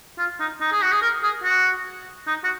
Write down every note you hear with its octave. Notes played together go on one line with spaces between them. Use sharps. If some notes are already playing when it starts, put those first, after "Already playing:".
F4
D#4
D#4
G#4
F#4
G#4
A#4
G#4
F#4
D#4
F#4